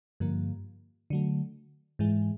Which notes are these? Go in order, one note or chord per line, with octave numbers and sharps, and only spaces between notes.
G2 D3 F3 A#3
D3 F#3 A3
G#2 E3 G#3